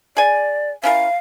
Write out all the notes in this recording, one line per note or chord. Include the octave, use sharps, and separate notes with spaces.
G#4 D5 G#5
C#4 E4 A#4 F5